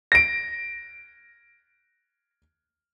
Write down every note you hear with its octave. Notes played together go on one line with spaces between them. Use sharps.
A#6 D7